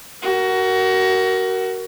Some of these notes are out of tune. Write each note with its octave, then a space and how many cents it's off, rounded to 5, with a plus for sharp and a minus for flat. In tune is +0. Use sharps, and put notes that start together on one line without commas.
F#4 +25 A#4 +0